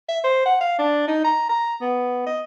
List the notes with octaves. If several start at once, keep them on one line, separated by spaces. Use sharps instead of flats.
E5
C5
F#5
F5
D4
D#4
A#5
A#5
B3
D#5